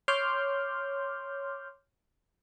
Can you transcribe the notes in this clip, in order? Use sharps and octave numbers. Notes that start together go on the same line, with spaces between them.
C#5 C6 D6 F6 G6